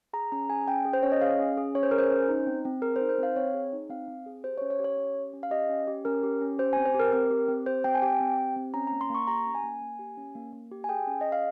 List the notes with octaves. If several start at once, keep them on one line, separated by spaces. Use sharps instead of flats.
G#4 A#5
C#4 A#5
G#4 G#5
C#4 G5
G#4
C5
C#4 C#5
D#5
G#4 F5
C#4
G#4
C#4 C#5
C5
G#4 A#4
C5
C#4
D#4
C4
C4
G#4 A#4
C5
D#4
C5
C4 F5
C4 C#5
G#4
D#4
C4 F5
C4
G#4
G4 C5
C#4 C#5
C#5
G4
C#5
C#4
G4
C#4
F5
G4 D#5
C#4
G4
C#4 A#4
G4
C#4
G4 C5
C4 G#5
C5
G4
A#4
C4 A#4
G4
C4
G4 C5
C4 G5
G#5
G4 G5
C4
G4
C4
C#4 A#5
A#3 A#5
C6
A#3 C#6
G4 A#5
C#4
G#5
A#3
A#3
G4
C#4
A#3
A#3
G4
G#5
G#4 G5
C#4
G#4 D#5
F5